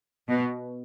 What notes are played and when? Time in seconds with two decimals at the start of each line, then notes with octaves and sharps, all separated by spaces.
0.28 B2